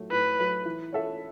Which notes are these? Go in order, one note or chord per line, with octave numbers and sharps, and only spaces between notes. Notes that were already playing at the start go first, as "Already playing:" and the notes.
Already playing: A2 F#3 A3
A2 B4
F#3 A3
E3
C#4 A4 E5